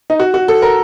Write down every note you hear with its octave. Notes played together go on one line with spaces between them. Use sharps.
D#4
F#4
F#4
A4
A#4